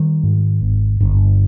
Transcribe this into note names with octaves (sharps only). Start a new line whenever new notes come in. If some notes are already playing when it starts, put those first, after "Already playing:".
Already playing: D#3 G3
G#2
G#1
G1